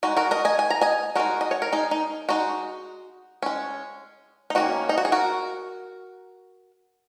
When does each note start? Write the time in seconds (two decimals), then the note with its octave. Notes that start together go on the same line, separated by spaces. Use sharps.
0.03 G#3 D#4 F#4
0.17 F#4 A#4
0.31 A#4 D#5
0.45 D#5 G#5
0.59 G#5
0.70 A#5
0.81 D#5 G#5
1.15 G#3 D#4 F#4 A#4
1.41 D#5
1.51 C#5
1.62 A#4
1.72 D#4 G#4
1.91 D#4
2.29 G#3 D#4 F#4
3.42 G#3 C#4
4.50 D#4
4.55 D#3 A#3 C#4 F#4
4.89 D#4
4.98 F#4
5.05 G#4
5.12 F#4 A#4